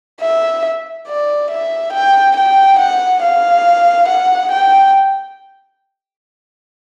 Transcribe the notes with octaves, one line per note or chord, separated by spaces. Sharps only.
E5
D5
E5
G5
G5
F#5
F5
F#5
G5